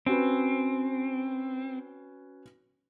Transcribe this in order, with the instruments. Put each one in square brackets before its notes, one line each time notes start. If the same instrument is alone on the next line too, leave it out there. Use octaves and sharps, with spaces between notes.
[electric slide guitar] C4 [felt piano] C#4 F#4 B4